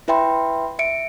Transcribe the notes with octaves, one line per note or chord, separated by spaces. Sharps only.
E4 B4 E5 G5 B5 C6
E5 C#7 D7